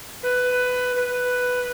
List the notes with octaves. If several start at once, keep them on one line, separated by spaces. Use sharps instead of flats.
B4
B4